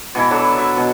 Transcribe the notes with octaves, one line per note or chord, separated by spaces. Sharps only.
B2 E3 E4
F#3 D4 A4
E5
B2